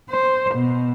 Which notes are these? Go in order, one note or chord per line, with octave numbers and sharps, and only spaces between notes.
C5
B2